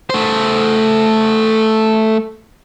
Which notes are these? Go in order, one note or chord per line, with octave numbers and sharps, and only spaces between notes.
A3 C5